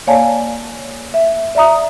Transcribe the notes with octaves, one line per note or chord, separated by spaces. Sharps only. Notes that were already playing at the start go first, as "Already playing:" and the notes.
A#3 C#5 D5 F5 G#5 A5
E5
D5 E5 A#5 D#6